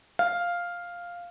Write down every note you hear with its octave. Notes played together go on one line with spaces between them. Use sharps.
F5